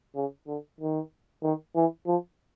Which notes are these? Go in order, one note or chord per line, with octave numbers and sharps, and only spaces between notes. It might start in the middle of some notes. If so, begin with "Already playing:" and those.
C#3
D3
D#3
D#3
E3
F3